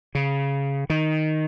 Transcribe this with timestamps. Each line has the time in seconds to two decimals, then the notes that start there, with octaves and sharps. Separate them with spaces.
0.15 C#3
0.90 D#3